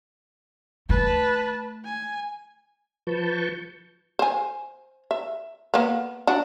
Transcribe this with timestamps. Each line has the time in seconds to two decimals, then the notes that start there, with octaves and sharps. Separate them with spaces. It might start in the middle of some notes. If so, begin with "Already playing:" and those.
0.89 A3 B4 A5
1.85 G#5
3.07 F3 B4 A5 C#6 G6
4.19 C5 G#5
5.11 E5
5.74 A#3 B3
6.27 D4 F#4